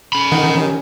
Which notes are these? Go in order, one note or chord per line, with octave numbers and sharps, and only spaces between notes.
C#4 B5
D#3 F#5
F3 C#4 G4